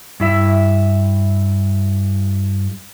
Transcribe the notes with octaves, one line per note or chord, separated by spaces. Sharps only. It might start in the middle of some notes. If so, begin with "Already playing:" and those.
G2 E4 E5